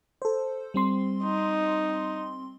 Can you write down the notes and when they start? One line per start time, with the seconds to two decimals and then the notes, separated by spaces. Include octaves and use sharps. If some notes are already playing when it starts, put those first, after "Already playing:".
0.22 A4 C5
0.74 G3 C4 C6
1.24 D#4